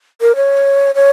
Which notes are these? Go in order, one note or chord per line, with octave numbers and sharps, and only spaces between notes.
A#4
C#5
C#5